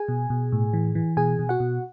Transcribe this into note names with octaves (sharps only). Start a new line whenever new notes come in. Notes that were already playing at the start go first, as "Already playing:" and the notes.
Already playing: G#4 G#5
B2
B2
A2
E3
E3
B2 G#4 G#5
B2
F#4 F#5
B2